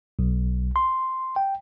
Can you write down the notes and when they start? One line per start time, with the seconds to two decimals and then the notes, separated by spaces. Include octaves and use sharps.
0.19 B1
0.76 C6
1.36 G5